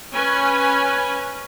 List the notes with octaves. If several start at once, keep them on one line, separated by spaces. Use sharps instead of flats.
C#4 B4 G#5